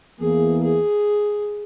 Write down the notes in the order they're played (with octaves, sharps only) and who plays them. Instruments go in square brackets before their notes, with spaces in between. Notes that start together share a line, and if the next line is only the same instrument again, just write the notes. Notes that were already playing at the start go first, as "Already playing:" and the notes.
[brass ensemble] E2 E3 A#3 [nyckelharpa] G#4
[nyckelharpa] G#4